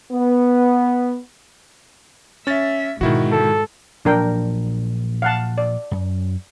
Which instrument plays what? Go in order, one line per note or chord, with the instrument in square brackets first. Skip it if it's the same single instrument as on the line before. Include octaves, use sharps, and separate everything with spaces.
[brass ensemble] B3
[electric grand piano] C#4 A6 [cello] E5
[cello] G#2 [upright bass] B2 D3 [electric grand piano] D#3 E4 F#4
[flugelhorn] A4
[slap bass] A#2 F3 F#3 [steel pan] D4 A#4 G5
[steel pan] F5 F#5 A5
D5
[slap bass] F#2